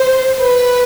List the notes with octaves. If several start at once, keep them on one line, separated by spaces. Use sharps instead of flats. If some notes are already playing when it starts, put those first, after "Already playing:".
Already playing: C5
B4